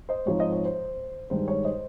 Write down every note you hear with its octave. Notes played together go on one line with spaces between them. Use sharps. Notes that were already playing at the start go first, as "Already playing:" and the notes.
C5 D#5
G#2 F3 C4 D#4 C#5
C5 D#5
C#5
C5
G2 D#3 G#3 C5
C#5
C5 D#5